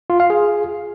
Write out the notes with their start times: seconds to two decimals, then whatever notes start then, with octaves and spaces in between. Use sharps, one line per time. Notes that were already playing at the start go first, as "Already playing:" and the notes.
0.10 F4
0.20 F5
0.30 G#4